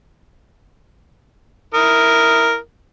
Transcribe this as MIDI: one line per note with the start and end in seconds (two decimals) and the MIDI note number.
1.74 2.57 64
1.74 2.57 70
1.74 2.57 87